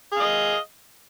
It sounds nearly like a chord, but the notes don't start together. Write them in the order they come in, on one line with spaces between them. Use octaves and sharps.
G#4 F5 D#5